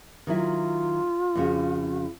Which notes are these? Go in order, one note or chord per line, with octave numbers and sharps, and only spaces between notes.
D#3 F#3 E4 F4
F2 C#3 F#4